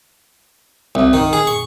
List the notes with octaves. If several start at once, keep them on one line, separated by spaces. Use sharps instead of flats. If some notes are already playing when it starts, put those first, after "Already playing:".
C2
D#3
G#4
C#6